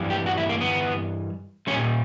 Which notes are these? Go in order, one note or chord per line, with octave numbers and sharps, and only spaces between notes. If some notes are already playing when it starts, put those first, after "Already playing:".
Already playing: G2 E3 G3
G4
F#4
E4
A#3
B3
A#2 G3 C#4